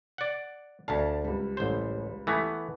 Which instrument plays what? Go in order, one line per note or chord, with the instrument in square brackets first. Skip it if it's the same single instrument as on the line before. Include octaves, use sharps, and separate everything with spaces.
[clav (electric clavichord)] D5 F#5
[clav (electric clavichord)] D2 F5 [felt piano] D5 A5
[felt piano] C#2 G3
[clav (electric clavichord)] A1 C5
E3 A3 B3